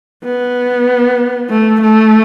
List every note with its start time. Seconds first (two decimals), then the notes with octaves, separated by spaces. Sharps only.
0.24 B3
1.50 A3
1.81 A3